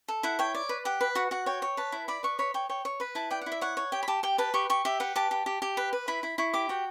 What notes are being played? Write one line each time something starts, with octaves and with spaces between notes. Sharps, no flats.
A4
E4 F#5
C#5 G5
D5
B4
G4 F#5
B4
F#4 F#5
F#4 F#5
C#5 G5
C#5
B4 A5
E4
D5 B5
B4 C#6
C#5 B5
C#5 G5
C#5 G5
C#5
B4 B5
E4 A5
D5 G5
F#5
E4
E5
C#5 F#5
C#5
G4 G5
B5
G4 A5
G4 G5
B4 A5
G4 C#6
G4 C#6
G4 E5
B4 F#5
G4 A5
G4
G4
G4
B4
B4
E4 B5
E4 B5
E4 C#6
G4 D6
F#4 G5